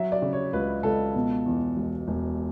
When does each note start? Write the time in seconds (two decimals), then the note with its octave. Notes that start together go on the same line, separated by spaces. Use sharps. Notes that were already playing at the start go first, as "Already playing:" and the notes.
Already playing: F#3 E5
0.12 D5
0.22 C#3
0.33 C#5
0.53 C#2 B4
0.83 C#2 A4
1.15 B2
1.46 E2
1.76 E1
2.08 E1